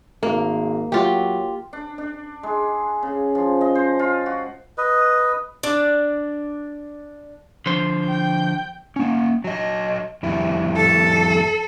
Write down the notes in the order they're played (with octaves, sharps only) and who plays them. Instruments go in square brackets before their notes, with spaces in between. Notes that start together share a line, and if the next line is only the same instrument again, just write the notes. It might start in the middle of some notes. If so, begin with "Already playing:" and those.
[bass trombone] G#1 [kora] A#3
[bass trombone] F#3 [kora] F4 G4
[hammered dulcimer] D4
D4
G#3
C#3
F3
D#5
C5
F4
F#4
[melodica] B4 D#5
[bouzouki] D4 D5
[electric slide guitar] D3 F3 C5
[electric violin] G5 G6
[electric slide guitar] A#3 C#4
F#3 D#5
F2 G3 E4
[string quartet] A4